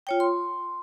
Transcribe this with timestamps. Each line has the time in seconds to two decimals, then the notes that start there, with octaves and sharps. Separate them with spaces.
0.07 F4 C#5 G5
0.20 C6